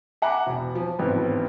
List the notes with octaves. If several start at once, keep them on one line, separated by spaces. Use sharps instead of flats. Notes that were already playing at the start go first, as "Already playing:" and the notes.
E5 F#5 G#5 A#5 B5 D6
E1
F3
A1 F2 G#2 D#3 B3